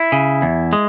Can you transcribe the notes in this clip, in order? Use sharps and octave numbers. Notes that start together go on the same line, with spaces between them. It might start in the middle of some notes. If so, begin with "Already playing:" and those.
Already playing: E4
C#3
E2
G#3